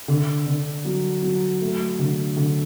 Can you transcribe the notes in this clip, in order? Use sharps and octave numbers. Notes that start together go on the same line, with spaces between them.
D3
D3
F#3
F#3
A3
D3
D3